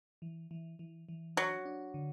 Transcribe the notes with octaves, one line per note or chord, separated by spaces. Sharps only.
E3
E3
E3
E3
F#3 D4
D4
D3